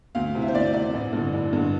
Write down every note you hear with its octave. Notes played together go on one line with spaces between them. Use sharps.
D2 F5
C3 E3
E5
C5
D2 D5
C3 E3 D5
A1
G2 D3
A1
G2 D3